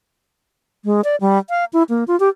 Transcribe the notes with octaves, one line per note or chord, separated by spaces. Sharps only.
G#3
D5
G3
F5
E4
A#3
F4
G4